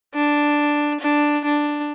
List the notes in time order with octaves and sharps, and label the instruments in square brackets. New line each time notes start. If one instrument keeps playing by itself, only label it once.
[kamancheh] D4
D4
D4